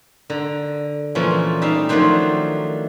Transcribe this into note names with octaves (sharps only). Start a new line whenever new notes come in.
D3 A#5
A#2 E3 F3 A3 A#3 C#4
G3 D#4 E5 F5
D#3 F3 F#3 A3 D4 C5